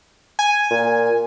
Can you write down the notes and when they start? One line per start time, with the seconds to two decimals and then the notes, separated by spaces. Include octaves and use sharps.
0.39 G#5
0.70 A#2